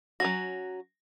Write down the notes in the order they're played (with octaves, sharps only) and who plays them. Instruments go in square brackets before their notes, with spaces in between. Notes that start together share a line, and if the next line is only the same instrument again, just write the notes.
[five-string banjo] F#3 C#4 F#4 [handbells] A#6